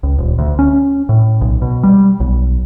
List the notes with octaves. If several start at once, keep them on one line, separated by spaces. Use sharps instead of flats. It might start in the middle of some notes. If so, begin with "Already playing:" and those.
C#2
D#1
D2
C#4
A2
B1
B2
G3
B1